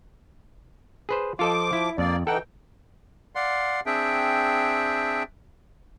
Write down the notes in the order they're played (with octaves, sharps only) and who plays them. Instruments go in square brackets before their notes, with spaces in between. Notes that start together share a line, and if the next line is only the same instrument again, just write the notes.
[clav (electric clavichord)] G#4 B4 C5
[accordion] F3 D6 [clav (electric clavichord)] F4 A4 D#5
[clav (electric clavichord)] E4
[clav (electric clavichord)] F2 [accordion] A#3 D5
[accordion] E3 D#4 G5 [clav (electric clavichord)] A4 F#5
[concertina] D5 F5 F#5 C6
C4 D4 G#4 E5 G5